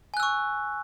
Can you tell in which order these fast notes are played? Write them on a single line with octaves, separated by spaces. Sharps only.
G#5 F#6 E6 C#6